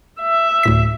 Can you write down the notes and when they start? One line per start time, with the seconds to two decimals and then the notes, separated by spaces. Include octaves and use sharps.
0.21 E5
0.63 D2 A2 B6